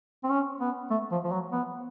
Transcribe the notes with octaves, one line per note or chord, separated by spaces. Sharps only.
C4
C#4
B3
A3
F3
F3
F#3
B3